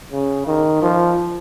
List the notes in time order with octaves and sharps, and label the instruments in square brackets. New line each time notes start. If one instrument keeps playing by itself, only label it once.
[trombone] C#3
D#3
F3